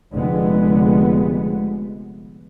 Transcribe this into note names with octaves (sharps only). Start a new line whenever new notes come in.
F1 D3 G#3 B3